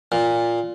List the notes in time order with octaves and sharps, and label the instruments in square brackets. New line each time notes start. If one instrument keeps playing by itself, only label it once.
[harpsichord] A#2